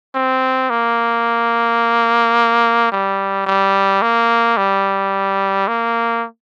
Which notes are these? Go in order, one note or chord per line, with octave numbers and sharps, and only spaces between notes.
C4
A#3
G3
G3
A#3
G3
A#3